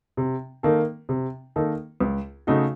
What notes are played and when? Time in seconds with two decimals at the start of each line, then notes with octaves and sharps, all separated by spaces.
0.17 C3
0.63 D#3 A#3 D#4 A4
1.09 C3
1.56 D#3 A#3 D#4 A4
2.00 C#2
2.47 C#3 A3 D#4 F#4